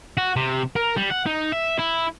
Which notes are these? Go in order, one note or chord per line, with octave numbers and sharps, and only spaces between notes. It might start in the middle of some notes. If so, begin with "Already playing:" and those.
F#4
C3
A#4
G3
F#5
D#4
E5
E4